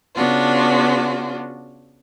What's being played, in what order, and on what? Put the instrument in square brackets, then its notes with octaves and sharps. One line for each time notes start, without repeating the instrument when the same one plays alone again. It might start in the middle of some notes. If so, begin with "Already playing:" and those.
[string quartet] C#3 B3 D4 F4 F#4